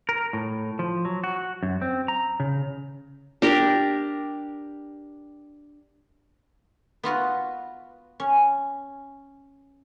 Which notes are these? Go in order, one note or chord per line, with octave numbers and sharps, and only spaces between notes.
A#4
A2
F3
F#3
F#4
F#2
C4
A#5
C#3
D4 G4 A#4
B3 F4 F#4 B4
C#4